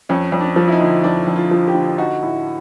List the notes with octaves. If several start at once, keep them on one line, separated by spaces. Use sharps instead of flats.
F2 C#4
F2
D4
F3
E4
D#4
D3
F2 D4
F2
F4
F3
G4
D3
D#4 F#4
A2